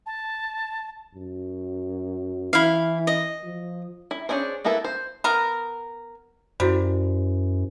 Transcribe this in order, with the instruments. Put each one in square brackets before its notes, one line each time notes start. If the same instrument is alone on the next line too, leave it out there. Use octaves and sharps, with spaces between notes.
[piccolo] A5
[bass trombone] F#2
[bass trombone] E3 [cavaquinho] E4 F5
[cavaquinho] D#5
[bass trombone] F3
[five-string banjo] E4
C#4 D4 E4 G#4 C5
A#3 B3 E4 A4 B4
C5
[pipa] B3 A#4
[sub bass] F#2 [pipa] G3 [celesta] E4 F#4 C5